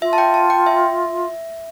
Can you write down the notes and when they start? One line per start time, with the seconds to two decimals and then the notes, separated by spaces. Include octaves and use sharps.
0.02 F4 E5
0.13 A5
0.18 G5
0.34 A5
0.50 G5
0.66 E5